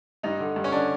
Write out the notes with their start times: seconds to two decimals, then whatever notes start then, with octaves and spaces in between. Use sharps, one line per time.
0.23 G2 D#4
0.40 D3
0.56 G2
0.64 C#4
0.72 D3 D4